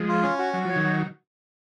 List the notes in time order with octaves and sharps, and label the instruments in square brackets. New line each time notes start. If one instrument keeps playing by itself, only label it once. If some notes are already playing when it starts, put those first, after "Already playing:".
Already playing: [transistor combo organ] F3 G#3
[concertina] F4
C#4
F#4
[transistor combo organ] F#3 [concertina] F#4
[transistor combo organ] F3 [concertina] C#5
[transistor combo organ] D#3 F#3
[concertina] F#4